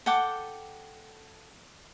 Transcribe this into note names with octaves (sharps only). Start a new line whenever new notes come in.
A4 F#5 G5 D6